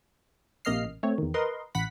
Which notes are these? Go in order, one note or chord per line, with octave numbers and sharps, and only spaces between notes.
A#1 C3 A#3 D#5 F6 C7
A1
A3 C4 C#5
E2 D#3
A#4 B4 D#5 C6
A1 F#5 B5 B6